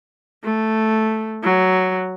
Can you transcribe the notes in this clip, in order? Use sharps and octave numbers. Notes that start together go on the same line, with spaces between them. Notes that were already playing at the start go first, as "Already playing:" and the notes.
A3
F#3